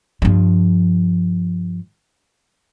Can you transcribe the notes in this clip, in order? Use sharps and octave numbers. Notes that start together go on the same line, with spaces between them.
G2 F3